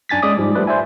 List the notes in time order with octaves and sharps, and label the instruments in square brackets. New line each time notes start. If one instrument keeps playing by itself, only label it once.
[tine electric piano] F#2 D4 G#5 A6 B6
G#3 C#4 D5 D6 D#6
G#2 F3 G3
F3 G3 A3 B4
C5 D5 E5 G#5